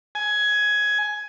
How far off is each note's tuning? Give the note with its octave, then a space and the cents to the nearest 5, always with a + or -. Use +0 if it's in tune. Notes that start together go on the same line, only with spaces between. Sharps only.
G#5 +15